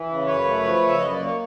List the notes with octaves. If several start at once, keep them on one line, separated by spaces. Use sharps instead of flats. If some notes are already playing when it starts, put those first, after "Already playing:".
Already playing: E3
C#3
F#2 B4 C#5
A3
F3
C#3 E5
F#2 D#5
D5
A#3
C#5